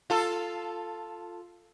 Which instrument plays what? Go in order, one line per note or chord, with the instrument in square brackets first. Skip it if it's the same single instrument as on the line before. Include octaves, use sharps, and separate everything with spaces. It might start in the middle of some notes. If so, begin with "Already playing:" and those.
[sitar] F4 A4